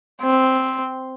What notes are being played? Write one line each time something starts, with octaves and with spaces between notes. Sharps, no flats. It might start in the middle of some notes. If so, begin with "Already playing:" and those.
C4